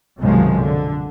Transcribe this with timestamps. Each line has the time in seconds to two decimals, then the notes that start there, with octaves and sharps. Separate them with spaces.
0.20 B1 F#2 C3 D#3 F3 G#3
0.57 D3